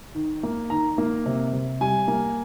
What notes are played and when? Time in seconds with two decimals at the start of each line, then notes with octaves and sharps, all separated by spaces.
0.15 D#3
0.43 A#3
0.70 D#3 A#5
0.98 A#3
1.26 C3
1.53 C3
1.81 G3 G#5
2.08 A#3